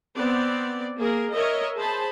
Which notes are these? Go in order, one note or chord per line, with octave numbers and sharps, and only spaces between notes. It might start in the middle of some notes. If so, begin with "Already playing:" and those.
B3 C4 D5
A#3 G#4 A#4
A#4 C#5 D#5 E5
G#4 C5 A5 B5